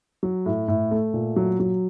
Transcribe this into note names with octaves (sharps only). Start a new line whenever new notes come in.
F#3
A2
A2
A3
A#2
F#3
F#3